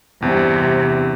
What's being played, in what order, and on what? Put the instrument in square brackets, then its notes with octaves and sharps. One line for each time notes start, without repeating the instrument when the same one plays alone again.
[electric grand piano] E2 [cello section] G2 C3